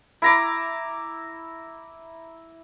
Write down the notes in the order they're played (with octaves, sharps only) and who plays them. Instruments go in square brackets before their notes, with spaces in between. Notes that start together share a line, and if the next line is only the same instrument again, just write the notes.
[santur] E4 A#5 D6